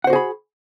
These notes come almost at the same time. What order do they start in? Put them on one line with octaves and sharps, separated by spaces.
F#5 C5 F#4 G#4 B5